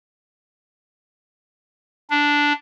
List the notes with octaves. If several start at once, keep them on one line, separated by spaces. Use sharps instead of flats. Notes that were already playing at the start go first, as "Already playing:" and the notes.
D4